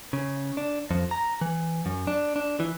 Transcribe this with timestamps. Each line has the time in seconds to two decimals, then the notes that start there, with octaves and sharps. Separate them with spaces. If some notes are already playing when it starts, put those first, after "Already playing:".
0.13 C#3
0.57 D4
0.91 F2
1.11 A#5
1.41 E3
1.86 F#2
2.07 D4
2.36 D4
2.60 E3